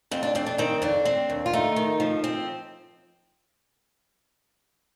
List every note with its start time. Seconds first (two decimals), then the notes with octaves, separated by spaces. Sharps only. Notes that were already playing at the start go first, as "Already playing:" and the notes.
0.11 F2 C4
0.23 D4
0.35 F2 C4
0.46 D4
0.58 D#3 C4
0.82 F2 D4
1.05 C4
1.30 D#2
1.46 F4
1.53 A3 D#4
1.76 D#3
2.00 F3
2.24 C4